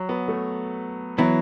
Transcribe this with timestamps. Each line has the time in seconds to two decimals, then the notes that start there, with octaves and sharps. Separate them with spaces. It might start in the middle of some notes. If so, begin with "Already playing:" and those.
Already playing: F#3
0.09 B3
0.28 A3
1.18 E3 F#3 B3 E4